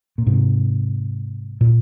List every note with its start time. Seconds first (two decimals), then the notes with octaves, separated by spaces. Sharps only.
0.18 A#2
0.26 G#2 C3
1.61 A#2